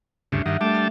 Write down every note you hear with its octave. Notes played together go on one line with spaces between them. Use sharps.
D2 G2 C#3 D4 E4
G2 D#3 E5 F#5
G3 A3 D4 A#4 A5
F6